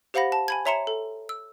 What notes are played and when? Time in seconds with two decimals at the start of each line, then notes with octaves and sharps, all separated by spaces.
0.14 G4 C5 F5 F#5 B5 A#6
0.32 A5
0.48 G#5 B5 G#6
0.65 C#5 E5 A#5 C6 C#7 E7
0.87 A4
1.29 E6